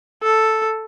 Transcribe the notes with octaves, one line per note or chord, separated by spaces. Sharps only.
A4